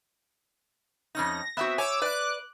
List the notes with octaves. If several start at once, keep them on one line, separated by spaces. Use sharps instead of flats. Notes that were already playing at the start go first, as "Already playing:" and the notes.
F2 C#4 D#4 A#6
B3 C4 F#4 E5
C#5 G#5 D6 E6
B4 D5 D6 F#6